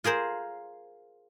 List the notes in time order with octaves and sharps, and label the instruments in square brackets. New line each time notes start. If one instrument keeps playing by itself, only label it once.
[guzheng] F4 G#4 A#4 C5